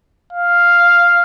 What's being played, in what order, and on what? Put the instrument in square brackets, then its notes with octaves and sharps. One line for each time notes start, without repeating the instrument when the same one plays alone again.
[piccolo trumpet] F5